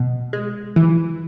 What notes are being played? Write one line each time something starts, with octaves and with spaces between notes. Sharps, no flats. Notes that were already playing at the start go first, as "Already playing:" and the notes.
Already playing: B2
G#3
E3